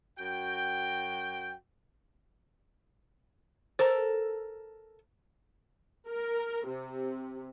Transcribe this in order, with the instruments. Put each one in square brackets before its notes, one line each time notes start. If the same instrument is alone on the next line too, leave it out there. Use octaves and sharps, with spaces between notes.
[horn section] F#2 F#4 G5
[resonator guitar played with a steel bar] A4 A#4 [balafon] C5
[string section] A#4
C3